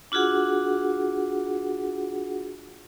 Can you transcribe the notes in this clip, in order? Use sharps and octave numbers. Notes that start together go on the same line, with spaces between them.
D4 F4 F#4 G#4 F#5